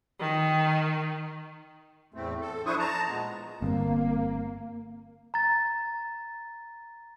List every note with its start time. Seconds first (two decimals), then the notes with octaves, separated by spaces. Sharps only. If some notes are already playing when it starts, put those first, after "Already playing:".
0.20 D#3
2.14 E2 A2 A3 C4
2.41 A4
2.66 F3 D4 E4 C5 C#6 D#6
2.79 A5 A#5
3.08 A#2 G#3 B3
3.62 G1 A#3 C4
5.34 A#5 A6